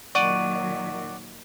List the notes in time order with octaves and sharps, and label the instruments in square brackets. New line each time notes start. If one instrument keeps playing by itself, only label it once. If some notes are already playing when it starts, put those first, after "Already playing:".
[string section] A#2 D#3 F#3 [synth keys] D5 F#5 [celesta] C#6 D#7